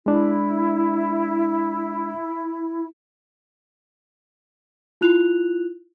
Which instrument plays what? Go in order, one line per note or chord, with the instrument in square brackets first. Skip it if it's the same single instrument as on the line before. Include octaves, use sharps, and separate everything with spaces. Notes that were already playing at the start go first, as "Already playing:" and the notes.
[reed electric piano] G#3 D4 [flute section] E4
[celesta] E4 F4 F#6 F7